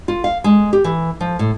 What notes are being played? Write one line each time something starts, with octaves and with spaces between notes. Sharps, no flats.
F4
F5
G#3
G4
E3
F3
A2